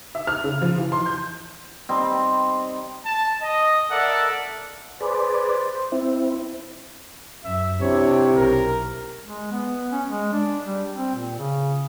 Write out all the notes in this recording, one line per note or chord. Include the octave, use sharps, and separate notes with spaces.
E5
F6
C#3
F3
E3
C6
G6
G3 C4 D#4
A5
D#5
A4 A#4 D5 E5 F#5
G#4 B4 C5 D5
C4 E4
F#2 E5
C3 D4 E4 C#5
B1 A#4
G#3
B3
C#4
G#3
D4
G3
C4
A#2
C#3